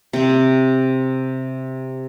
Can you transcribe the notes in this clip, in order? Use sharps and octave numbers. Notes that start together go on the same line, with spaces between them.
C3 C4